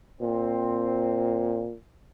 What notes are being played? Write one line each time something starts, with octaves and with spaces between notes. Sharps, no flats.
A#2 C4